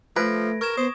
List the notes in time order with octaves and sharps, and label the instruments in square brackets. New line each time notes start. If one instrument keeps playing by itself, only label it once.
[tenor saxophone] F3 [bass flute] A3 [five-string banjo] B4 [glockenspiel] G#6 A#6 D7
[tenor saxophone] A#4 [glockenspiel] C#6 G#6 E7
[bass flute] B3 [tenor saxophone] C5 [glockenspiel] D#6